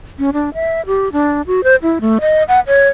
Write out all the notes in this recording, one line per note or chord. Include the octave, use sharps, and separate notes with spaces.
C#4
D4
E5
G4
D4
F#4
C5
E4
A3
D#5
F#5
C#5